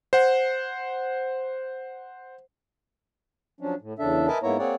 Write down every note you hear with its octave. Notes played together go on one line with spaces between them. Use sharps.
C5 F#5
F3 F#3 C#4 D4
A2
E2 C#3 D4 A4 E5
A#4 B4 D#5 E5 G#5 A5
G#2 A#3 B3 E4 C#5 A#5
A#3 C4 G#4 C#5 D5 F#5